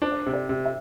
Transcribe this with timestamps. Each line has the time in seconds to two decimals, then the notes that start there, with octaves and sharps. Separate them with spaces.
0.02 D4 C5
0.12 D5
0.22 C5
0.26 C3
0.34 D5
0.49 C3
0.65 E5